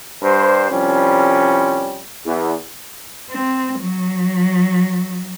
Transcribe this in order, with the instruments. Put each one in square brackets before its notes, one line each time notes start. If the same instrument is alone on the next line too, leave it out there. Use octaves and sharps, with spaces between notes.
[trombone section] G2 G3 C5
C2 F3 G3 C#4
E2
[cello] C4
F#3